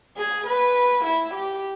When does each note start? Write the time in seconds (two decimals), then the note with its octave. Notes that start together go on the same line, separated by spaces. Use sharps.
0.18 G#4
0.47 B4
1.05 E4
1.34 G4